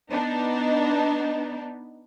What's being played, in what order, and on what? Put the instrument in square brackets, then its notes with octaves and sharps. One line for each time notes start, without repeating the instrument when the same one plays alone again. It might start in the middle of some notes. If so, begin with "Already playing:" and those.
[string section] B3 D4 D#4